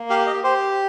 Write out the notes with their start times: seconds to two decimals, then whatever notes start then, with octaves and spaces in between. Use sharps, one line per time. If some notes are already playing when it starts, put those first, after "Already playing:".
Already playing: A#3
0.10 G4 F5
0.27 D#5
0.44 G4 C5